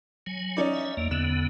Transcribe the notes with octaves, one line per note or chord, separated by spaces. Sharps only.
F#3 G#5
C#4 D#4 D5
E5
E2 A#3
E2 D3 B3 E7